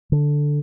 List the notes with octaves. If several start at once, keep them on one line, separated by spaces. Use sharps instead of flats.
D3